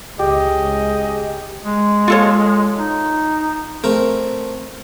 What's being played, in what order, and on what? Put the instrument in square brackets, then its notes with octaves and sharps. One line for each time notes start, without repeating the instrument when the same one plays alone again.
[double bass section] C#2 [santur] G4 [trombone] G#4 [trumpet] D#5
[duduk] G#3
[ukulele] F4 A4 C#5
[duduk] D#4
[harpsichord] A3 C4 A#4